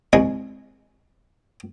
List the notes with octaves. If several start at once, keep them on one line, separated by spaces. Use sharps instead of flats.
C2 G#3 B5